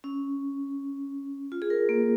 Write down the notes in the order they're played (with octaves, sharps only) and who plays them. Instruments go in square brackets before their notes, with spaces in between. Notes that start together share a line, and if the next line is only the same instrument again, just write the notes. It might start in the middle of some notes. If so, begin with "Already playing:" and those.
[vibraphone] C#4
F4
G#4
A#4
A#3